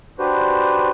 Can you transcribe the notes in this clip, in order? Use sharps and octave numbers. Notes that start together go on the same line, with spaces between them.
D4 F#4 G4 B4 C5